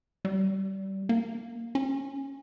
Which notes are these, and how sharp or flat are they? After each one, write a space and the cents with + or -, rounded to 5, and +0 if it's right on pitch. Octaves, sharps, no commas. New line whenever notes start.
G3 -25
A#3 +5
C#4 -15